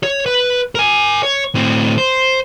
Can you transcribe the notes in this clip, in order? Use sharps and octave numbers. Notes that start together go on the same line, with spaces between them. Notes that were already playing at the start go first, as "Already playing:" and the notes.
C#5
B4
A#4 G#5
C#5
A2 C4
C5